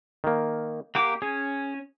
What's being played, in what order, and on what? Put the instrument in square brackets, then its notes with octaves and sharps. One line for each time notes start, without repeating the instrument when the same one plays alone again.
[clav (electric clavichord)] D#3 A#3
[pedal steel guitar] A#3 G4 D6 [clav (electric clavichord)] F#5
[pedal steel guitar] C#4 [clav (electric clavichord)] G#4